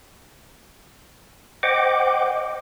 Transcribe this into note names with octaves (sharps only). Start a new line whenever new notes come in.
C5 D#5 F#5 G5 D6